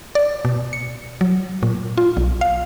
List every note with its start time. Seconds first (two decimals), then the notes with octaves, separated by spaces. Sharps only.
0.15 D5
0.45 B2
0.73 C#7
1.21 F#3
1.63 A#2
1.98 F4
2.17 B1
2.41 F5